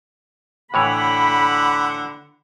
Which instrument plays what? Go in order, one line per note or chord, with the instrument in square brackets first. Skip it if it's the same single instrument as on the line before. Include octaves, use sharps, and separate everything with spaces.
[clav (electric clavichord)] A2 E3 C#5 [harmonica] D3 F#5 [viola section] B5